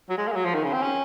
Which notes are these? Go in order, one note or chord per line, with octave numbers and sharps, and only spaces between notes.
F#3
G#3
A#3
G#3
F#3
F3
D#3
C#3
C4
C#4